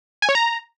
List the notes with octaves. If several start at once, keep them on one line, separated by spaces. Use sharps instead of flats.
G#5
C#5
A#5